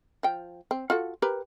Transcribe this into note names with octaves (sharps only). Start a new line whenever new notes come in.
F3 G5
C4
F4 F#4 A4
G4 A#4 B4